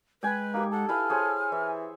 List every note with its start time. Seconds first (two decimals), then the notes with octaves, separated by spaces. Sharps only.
0.23 G#3 B4 G5 G#5
0.54 A#3 D#4 G4
0.72 A4 F#5
0.89 E4 B4 F5 G#5 F6
1.10 G#4 C5 C#5
1.52 E3 E5